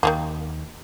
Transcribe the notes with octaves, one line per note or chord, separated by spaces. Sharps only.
D#2 D#3 F3 A#3